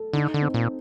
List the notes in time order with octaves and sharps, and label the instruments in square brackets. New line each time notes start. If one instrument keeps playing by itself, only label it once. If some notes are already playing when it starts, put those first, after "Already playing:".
Already playing: [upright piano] A4
[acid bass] D3 [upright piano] D#4
[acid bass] D3
[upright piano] C4
[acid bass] A#2